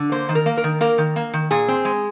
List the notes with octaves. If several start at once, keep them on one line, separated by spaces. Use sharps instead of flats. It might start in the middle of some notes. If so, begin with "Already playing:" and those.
Already playing: D3
A#3 C5
D#3
A#4
A#3
A#4
D#3
A#3 A#4
D#3
A#3
D#3
A#2 G#4
C4
G#3